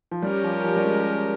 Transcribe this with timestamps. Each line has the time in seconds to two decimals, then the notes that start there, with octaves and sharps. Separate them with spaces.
0.11 F3
0.23 G3 C#4 G4 A#4
0.44 F3
0.64 F3
0.76 G3
0.85 G#3